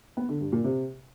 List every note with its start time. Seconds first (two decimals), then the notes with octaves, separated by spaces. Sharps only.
0.17 B3
0.29 D3
0.41 G2
0.52 A#2
0.64 C3